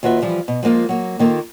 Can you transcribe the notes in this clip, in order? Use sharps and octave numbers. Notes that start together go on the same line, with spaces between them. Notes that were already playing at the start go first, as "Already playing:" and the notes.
D#2 F4 F#4 B4 E5
E3 F3 G3
B2
F3 G#3 A#3 F4
F#3 A#3
D#3 A#3 F4 A4